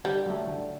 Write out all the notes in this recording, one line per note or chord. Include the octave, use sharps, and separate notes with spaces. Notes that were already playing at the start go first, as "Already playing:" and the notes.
D3 G3
F#3 A3
D3